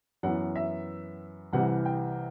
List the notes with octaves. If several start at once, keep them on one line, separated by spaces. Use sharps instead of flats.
F#2 E3 B3 F#5
E5
C2 C3 E3 G3 F#5
G5